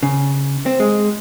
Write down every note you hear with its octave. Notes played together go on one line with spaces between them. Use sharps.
C#3
C4
G#3